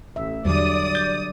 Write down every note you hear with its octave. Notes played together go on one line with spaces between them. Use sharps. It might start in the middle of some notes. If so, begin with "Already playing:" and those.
A1 E5
E2 D3 F#3 G3 D5 D#6
G6 A6